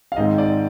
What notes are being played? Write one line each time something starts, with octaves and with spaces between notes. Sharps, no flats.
F5
G#2 D#3 G#3 C4 D#5
D5